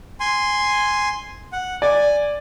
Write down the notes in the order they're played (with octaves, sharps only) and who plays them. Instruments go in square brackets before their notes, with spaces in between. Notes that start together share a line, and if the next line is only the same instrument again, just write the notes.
[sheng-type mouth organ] G#5 C6
F#5
[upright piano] D5 [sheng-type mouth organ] G#5